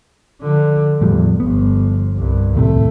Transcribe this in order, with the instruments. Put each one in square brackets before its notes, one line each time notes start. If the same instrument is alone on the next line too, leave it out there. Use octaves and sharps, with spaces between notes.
[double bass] D3 F3
[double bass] E2 [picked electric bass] A2 F3 G3
[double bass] G1 F3 [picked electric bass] B3
[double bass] C2 G2
[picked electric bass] D#2 A2 C3 [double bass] A3